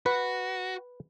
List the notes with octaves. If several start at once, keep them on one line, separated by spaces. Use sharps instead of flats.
F#4 B4